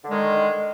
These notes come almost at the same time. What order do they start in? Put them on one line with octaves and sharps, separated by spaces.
D3 G#3 D#3